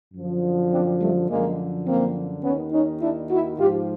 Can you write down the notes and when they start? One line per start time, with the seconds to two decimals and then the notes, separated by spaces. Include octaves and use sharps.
0.14 F#2 D3 F3
0.71 C4 D4
1.01 G3 A3
1.29 F#2 D3 F3 G#3 A#3
1.86 A#3 C4
2.44 D#2 D#3 B3 C#4
2.73 C#4 D#4
3.01 D4 E4
3.30 E4 F#4
3.58 G#2 F3 F4 G4